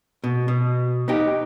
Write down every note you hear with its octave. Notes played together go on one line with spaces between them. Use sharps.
B2
B2
B3 D#4 G4